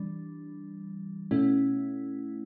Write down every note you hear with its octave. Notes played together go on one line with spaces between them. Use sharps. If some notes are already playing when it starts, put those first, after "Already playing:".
Already playing: E3 G3 D4
B2 A3 C#4 E4